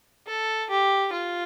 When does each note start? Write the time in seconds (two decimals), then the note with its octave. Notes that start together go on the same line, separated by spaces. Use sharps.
0.27 A4
0.70 G4
1.13 F4